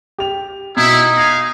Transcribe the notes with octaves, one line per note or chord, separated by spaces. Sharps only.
G4 F7
B2 D#4 E4
F5 G#5 A#6